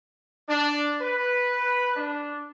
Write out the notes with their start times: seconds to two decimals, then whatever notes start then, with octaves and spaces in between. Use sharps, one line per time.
0.49 D4
1.02 B4
1.96 D4